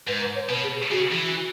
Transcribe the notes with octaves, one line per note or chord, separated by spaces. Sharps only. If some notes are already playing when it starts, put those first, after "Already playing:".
G#2 B4
B4
C#5
B2 B4
G#4
G#4
C#3 F#4
E3